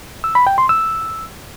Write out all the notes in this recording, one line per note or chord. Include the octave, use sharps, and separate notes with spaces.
E6
B5
G5
C6
E6